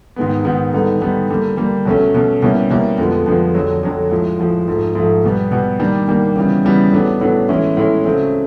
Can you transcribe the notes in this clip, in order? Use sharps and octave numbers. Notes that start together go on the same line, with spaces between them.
G#2 D#3 G#3 B3
G#2 D#3 G#3 B3
D3 G3 B3 D#4
D3 G3 B3 D#4
D3 G3 A#3
D3 G3 A#3
B2 F#3 A3 C#4
B2 F#3 A3 C#4
B2 G3 A#3 C#4 E4
B2 G3 A#3 C#4 E4
F2 D3 F3 G#3 B3
F2 D3 F3 G#3 B3
F2 D3 F#3
F2 D3 F#3
A2 F3 G#3
A2 F3 G#3
G#2 F3 A3
G#2 F3 A3
B2 G3 B3
B2 G3 B3
D#3 G3 A#3 D4
D#3 G3 A#3 D4
C#3 E3 G3 B3
C#3 E3 G3 B3
A2 F#3 B3 D4
A2 F#3 B3 D4
A2 E3 G#3 C#4 E4
A2 E3 G#3 C#4 E4
C#3 F#3 A3 C4